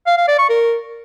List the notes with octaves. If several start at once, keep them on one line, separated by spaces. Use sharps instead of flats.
F5
F5
D5
C#6
A#4